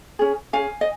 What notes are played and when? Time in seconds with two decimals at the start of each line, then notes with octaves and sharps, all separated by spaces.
0.19 C#4 G#4
0.53 C#4 G#4 F5 G#5
0.81 D#5